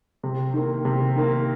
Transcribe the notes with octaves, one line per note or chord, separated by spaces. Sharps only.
C3
D#3 A#3
C3
D#3 A#3